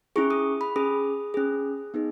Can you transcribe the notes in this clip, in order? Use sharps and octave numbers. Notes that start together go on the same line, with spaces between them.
C#4 E4 G#4 C#6
D#6
B5
C#4 G#4 D#6
C#4 G#4
B3 D#4 G#4